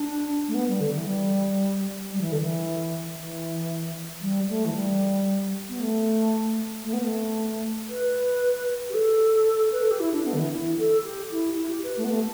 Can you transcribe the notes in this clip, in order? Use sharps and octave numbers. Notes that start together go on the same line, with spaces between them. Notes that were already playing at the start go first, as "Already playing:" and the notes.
Already playing: D4
A3
B3
G3
D3
E3
G3
G3
E3
D3
E3
E3
G3
A3
E3
G3
B3
A3
A3
B3
A3
B4
G4
A4
B4
A4
G4
E4
D4
B3
D3
E3
E4
A4
G4
E4
E4
G4
B4
A3
B3
A3